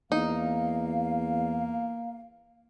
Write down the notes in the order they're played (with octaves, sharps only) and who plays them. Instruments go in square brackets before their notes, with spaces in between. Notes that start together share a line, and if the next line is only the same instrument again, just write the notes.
[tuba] E2 [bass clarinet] A#3 [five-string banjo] D#4 [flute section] F5